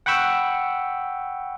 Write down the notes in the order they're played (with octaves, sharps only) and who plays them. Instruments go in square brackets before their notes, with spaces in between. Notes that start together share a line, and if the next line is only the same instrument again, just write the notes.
[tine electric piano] F#5 G5 B5 C#6 E6